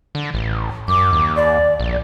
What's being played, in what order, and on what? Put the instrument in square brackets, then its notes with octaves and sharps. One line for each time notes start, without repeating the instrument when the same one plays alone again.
[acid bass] D3
A1
[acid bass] F#2 [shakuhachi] D6
[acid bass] D#2
[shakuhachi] D5
[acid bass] A#1